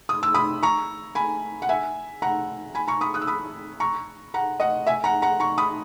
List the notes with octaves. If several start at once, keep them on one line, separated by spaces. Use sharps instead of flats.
D#6
E6
B5 D#6
A#5 C#6
G#5 B5
F#5
E5 G#5
F#5 A#5
G#5 B5
A#5 C#6
B5 D#6
D#6 F#6
E6
B5 D#6
A#5 C#6
F#5 A#5
D#5 F#5
E5 G#5
F#5 A#5
F#5 A#5
A#5 C#6
B5 D#6